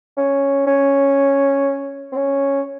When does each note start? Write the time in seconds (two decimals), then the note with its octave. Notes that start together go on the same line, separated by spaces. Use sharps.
0.17 C#4
0.66 C#4
2.12 C4
2.17 C#4